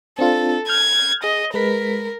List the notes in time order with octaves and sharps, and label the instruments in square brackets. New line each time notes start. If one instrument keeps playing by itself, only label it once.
[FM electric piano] C4 D4 F4 [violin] A4
[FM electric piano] F6 G6 [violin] G#6
[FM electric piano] G#4 [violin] D#5
[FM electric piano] G#3 B4 B6 [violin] A#4